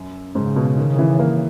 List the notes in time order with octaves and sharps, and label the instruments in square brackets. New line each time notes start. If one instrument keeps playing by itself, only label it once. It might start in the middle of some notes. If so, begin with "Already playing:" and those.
Already playing: [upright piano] F#2
[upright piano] G#2 [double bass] C#3
[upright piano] B2
D#3
D#3
E3
A#3